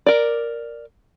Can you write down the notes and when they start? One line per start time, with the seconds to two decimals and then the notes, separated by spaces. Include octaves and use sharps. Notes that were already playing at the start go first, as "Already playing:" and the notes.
0.06 A#4 D5